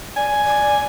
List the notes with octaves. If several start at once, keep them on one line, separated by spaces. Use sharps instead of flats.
D5 G#5
D5